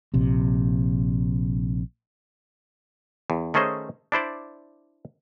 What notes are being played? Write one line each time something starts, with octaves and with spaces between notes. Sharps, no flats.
A#1 C3
E2
D#3 A3 C#4 G#4 C5 D#5
D4 E4 C5 D5